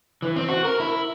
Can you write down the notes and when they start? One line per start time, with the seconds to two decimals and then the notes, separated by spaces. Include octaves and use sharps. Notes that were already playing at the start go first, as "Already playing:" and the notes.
0.22 E3
0.36 C4
0.48 F#4
0.65 A#4
0.80 E4